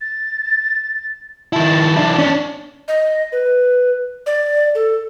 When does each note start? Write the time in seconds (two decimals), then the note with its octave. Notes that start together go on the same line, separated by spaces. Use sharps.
0.01 A6
1.53 D#3 E4 A5
1.96 E3 D4
2.18 C#4 D4
2.88 D#5
3.32 B4
4.26 D5
4.75 A4